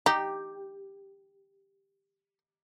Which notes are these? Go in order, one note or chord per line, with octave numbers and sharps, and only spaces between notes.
D#4 G4